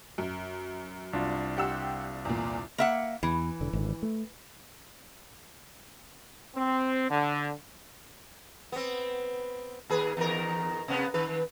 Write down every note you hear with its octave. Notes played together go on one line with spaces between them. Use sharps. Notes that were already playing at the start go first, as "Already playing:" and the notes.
F#2
C2 D4 F4
G4 F#5 E6
E2 A#2
A#3 E5 F#5
E2 E3
E1 D3
G#1 D3
A3
C4
D3
B3 C4
D#2 G#4 B4
E2 D#3 A#4
C3 B3
D#3 B4